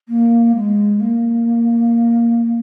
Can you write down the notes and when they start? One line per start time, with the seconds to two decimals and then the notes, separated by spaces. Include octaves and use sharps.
0.08 A#3
0.55 G#3
1.00 A#3